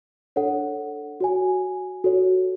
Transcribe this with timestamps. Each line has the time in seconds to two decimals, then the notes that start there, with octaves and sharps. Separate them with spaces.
0.36 D4 A4 C#5 F#5
1.20 F#4 C#5 G#5
2.04 F#4 A4 C#5